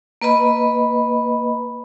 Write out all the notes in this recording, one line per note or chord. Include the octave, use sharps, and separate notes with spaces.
A#3 B4 D#5 B5